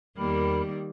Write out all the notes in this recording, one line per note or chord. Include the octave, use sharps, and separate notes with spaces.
E2 D#3 G3 A#3 A#4 B5